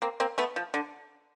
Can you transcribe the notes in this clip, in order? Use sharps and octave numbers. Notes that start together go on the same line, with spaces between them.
A#3 C4
A#3 C4
A3 B3
F3
D3